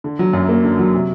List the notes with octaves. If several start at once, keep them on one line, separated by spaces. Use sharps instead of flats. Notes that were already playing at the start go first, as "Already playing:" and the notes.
D3
F#3
F#2
A#3
D3
F#3
C3